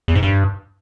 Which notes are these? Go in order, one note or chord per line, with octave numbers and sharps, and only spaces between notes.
E2
G#2
G2